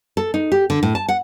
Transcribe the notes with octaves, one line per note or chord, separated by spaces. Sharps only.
A4
D#4
G4
D3
A2
A5
F#5